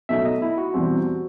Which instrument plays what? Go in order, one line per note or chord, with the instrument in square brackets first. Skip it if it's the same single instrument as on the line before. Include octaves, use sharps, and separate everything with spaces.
[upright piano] B2 F#3 A3 D#4 [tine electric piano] E5
[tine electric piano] D#5
E4
F#4
[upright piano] E2 B2 G3 C4